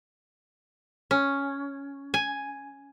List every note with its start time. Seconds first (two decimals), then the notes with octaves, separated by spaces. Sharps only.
1.11 C#4
2.14 G#5